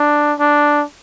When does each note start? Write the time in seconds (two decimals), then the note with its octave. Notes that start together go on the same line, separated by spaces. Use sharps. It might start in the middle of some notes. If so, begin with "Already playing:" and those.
Already playing: D4
0.39 D4